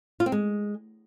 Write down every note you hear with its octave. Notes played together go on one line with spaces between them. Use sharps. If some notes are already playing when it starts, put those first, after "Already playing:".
F4
C4
G#3